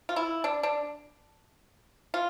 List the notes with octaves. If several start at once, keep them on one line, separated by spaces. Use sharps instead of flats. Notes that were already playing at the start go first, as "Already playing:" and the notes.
F4
E4
D4
D4
F4